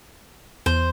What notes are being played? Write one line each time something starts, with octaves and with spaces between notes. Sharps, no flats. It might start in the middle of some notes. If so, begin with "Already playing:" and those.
E2 C5